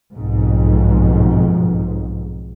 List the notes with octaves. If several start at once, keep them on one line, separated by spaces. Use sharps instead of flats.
B1 F2 G#2